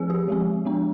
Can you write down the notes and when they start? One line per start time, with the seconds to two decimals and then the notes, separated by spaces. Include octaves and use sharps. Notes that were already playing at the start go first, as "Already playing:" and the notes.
Already playing: F3 C4 G#4
0.10 G4
0.28 F3 G#3 C4
0.65 F3 G#3 B3 D4